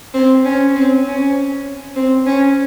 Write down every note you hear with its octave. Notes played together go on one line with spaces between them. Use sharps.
C4
C#4
C4
C#4
C4
C#4